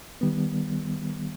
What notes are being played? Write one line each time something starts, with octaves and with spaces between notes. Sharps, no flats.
D#3 G3 B3